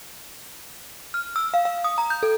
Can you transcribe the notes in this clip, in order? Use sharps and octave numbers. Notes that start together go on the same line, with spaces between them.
F6
E6
F5
F5
D#6
A#5
G6
A4